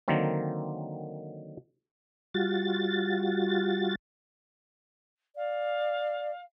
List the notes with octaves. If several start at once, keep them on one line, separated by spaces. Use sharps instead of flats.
D3 D#3 F#3 A#3 C4
G3 F4 F#4 A6
D5 F5